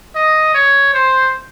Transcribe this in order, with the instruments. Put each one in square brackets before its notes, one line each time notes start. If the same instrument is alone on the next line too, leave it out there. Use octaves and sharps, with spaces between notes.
[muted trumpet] D#5
C#5
C5